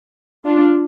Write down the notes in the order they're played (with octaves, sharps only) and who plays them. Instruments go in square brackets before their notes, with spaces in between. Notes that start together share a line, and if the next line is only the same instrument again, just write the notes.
[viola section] D4 F4